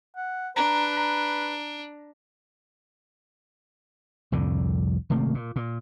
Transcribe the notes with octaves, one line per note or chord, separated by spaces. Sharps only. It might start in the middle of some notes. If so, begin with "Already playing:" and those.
F#5
D4 B4 A#5
A#5
C2 F2 A2 D3
G#1 C3 A3 A#3
A#2
A#2